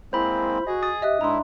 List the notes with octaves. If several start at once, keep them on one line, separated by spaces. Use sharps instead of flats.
G#3 A#3 C4 E4 C5 B5
F#4 G#4 D#5
D#6 A6
G4 D#5 E5 F#6
G#2 D4 E4 A#5 C6